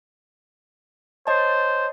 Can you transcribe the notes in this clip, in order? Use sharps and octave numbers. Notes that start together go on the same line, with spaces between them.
C5 C#5 D#5 A5